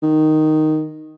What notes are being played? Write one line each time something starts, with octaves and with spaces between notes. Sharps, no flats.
D#3